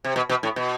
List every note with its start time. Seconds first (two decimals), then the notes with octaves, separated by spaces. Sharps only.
0.05 C3
0.16 B2
0.29 B2
0.43 A2
0.56 B2